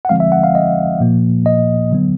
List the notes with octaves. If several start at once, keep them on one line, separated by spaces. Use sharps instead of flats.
F#5
D3 F3 G#3 C4 F5
E5
F#5
F5
D#5
A#2 F3 A#3
D#5
D3 F#3 B3